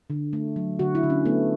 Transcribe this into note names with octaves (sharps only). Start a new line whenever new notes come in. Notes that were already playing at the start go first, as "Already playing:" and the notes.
D3
A3
F#3
D3 F#4
E4
D3
C#4
A3 B3